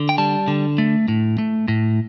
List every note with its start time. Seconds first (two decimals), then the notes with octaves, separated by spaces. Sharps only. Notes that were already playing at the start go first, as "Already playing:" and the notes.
Already playing: D3
0.09 G5
0.18 G3 A5
0.48 D3
0.78 A3
1.08 A2
1.38 A3
1.68 A2